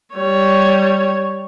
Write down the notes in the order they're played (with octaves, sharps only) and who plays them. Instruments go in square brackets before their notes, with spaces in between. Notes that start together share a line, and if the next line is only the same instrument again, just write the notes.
[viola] G3 C#5